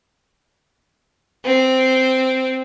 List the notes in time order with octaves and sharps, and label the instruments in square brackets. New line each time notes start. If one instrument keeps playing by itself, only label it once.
[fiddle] C4